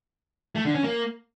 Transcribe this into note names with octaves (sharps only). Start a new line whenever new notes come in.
A3
D3
C#4
A#3